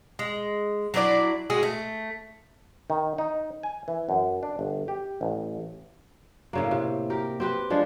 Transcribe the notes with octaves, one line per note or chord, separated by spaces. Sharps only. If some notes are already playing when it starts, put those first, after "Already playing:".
G#3
F#3 D4 E4 D5
G#3 F#4 G#4
A3
D#3
D#4
G#5
E3
F#2
D4
G1
G4
A1
A2 C#3 A#3
C3
G4 A#4
C4 G4 B4
F3 G#3 D4